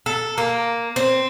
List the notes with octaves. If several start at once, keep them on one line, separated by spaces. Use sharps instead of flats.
A4
A#3
C4